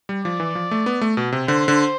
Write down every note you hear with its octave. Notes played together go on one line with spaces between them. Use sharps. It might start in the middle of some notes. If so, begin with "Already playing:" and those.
G3
F3 D5
E3
F3
A3
B3
A3
B2
C3
D3 C5
D3